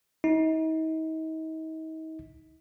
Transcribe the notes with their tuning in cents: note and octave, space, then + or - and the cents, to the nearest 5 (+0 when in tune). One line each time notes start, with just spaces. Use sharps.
D#4 +40